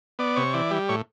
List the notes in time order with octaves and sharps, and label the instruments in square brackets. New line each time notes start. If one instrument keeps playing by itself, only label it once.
[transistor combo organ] B3 D5
C3 C#5
E3 D5
G3
A2 C#5